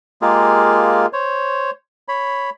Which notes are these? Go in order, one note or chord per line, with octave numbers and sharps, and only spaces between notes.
G#3 A#3 F4 G4 G#4 A#4
C5 C#5
C#5 B5